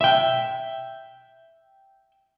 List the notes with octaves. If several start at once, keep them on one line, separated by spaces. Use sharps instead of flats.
E5 G5